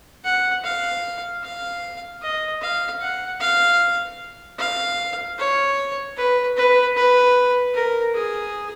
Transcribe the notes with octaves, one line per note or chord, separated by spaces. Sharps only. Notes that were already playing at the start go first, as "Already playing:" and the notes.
F#5
F5
F5
D#5
F5
F#5
F5
F5
C#5
B4
B4
B4
A#4
G#4